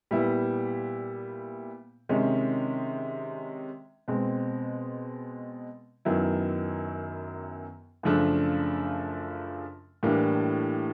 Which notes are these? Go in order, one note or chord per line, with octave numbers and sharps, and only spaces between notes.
A#2 G3 B3 E4
C3 D#3 G#3 C#4
B2 G#3 C4
F#2 D#3 F#3 B3 E4
F#2 C#3 F3 A3 D4
A2 E3 G3 A#3 D4